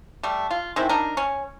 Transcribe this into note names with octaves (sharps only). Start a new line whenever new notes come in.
G3 A3
F4
D#3 G#3 C4 E4
D4 D#4 A#4
C#4